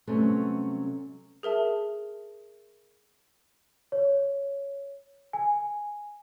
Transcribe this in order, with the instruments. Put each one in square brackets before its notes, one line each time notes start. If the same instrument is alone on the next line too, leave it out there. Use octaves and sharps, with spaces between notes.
[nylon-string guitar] C3 F#3 G3 A3 B3 C#4
[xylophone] G#4 A#4 E5 A5
[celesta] C#5
G#5